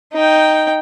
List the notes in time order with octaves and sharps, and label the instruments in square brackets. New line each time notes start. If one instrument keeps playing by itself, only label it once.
[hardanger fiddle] D#4 G5